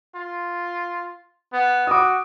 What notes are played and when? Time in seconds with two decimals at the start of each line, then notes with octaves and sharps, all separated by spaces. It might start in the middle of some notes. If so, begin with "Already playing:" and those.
0.15 F4
1.53 B3
1.87 F#4 D6 D#6